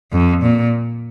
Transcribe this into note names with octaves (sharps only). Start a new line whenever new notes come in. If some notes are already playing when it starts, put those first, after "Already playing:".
F2
A#2